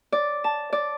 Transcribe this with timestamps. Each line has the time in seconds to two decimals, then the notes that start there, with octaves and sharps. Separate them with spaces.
0.12 D5
0.44 A5
0.73 D5